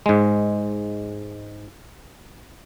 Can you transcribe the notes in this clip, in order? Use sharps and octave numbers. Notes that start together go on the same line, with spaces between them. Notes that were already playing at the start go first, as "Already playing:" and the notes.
G#2 G#3